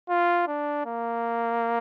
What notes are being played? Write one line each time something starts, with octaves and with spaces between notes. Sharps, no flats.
F4
D4
A#3